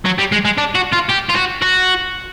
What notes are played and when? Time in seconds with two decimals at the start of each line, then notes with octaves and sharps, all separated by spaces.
0.05 F#3
0.19 G3
0.32 G#3
0.45 G#3
0.58 D4
0.75 F#4
0.93 F4
1.10 G4
1.30 F4
1.36 F#4
1.62 F#4